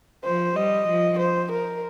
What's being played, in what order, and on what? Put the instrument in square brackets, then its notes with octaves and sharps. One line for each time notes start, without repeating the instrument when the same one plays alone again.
[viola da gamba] F3 [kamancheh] C5
[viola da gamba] G3 [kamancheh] D#5
[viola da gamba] F3
[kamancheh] C5
A#4